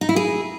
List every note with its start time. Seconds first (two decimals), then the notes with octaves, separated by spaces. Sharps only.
0.01 D#4
0.09 E4
0.16 G#4